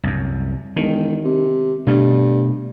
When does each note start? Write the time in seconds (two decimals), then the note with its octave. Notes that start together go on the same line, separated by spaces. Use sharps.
0.04 C2 F#2
0.76 E1 D#3
1.25 C3
1.87 G2 B2 A3